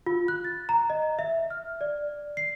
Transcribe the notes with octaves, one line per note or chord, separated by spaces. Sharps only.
F4
F#6
A6
A#5
D#5
E5
F6
D5
C7